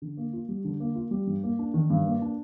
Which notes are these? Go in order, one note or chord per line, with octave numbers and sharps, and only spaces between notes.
D3
A#3
F4
G3
D3
A#3
F4
G3
G2
A#3
D4
D#3
G2
A#3
D4